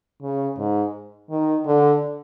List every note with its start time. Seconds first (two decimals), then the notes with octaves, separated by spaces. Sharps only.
0.22 C#3
0.58 G#2
1.31 D#3
1.66 D3